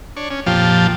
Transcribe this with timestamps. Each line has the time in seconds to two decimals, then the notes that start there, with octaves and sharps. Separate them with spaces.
0.17 D4 C#5
0.31 C#4
0.46 F2 A#2 F3 G4 F5 A5